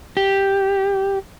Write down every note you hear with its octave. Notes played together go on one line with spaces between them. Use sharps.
G4